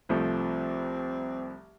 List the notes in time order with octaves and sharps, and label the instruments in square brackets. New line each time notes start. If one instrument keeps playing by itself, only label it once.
[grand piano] C2 F3 A3 [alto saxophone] C4